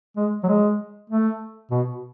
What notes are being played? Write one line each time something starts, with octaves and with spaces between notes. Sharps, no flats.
G#3
F#3
G#3
A3
B2